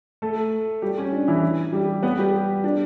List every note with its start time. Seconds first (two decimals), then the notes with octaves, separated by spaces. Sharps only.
0.22 A3 A4
0.82 G3 G4
0.98 C#4
1.13 D4
1.28 E3 E4
1.73 G3 G4
2.03 B3 B4
2.18 G3 G4
2.64 D4